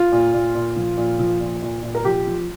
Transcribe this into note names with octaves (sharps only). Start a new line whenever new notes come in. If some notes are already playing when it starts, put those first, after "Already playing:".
Already playing: F4
A#2
A#2
A#2
F3
A#2
F3
A#2
A#2
A#2
A#4
F3 G4
F3